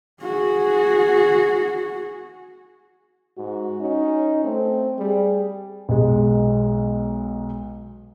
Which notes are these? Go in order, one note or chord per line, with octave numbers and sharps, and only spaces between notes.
F#4 G#4
G#2 F#4
C#4 D#4
A3 C4
G3 G#4
B1 G#3